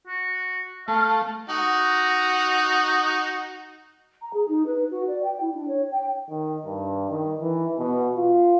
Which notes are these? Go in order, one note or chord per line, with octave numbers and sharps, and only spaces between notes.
F#4
A3 F5
D#4 F#4
A#5
G#4
D#4
B4
F#4
D5
G5
E4
D4
C#5
G5
D#3
G2
D#3
E3
B2
F4